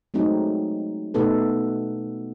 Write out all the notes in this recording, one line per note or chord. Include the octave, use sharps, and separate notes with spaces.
F#3 G#3 A3 C4 D#4
B2 A3 B3 D#4 A4 B4